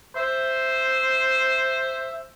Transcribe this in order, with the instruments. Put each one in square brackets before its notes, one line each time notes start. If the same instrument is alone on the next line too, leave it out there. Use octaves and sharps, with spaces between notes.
[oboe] C5 [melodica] E5